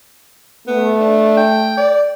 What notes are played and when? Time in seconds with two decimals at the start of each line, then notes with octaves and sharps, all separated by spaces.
0.67 A3 B3
0.99 D4
1.37 G5
1.77 D5